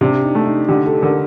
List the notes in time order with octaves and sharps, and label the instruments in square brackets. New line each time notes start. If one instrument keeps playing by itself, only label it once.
[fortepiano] C3 [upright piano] D4
[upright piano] D#4
[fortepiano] A3
[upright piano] D#4
[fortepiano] D3 [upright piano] G4
[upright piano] A4
[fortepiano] D3 [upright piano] A#4